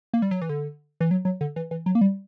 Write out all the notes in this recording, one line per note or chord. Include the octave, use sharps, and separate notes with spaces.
A#3
G3
F#3
E3
D3
E3
F#3
F#3
D3
E3
E3
F#3
A#3
G3